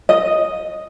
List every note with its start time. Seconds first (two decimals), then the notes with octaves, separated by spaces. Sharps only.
0.09 D#5